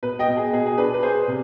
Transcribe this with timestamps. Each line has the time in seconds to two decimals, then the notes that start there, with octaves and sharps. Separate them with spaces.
0.03 B2 B4
0.19 D#5 G5
0.28 B2
0.37 G#4
0.53 B2 G#4
0.66 G#4
0.78 D4 B4
0.94 B4
1.03 B3 G#4 C5
1.28 C3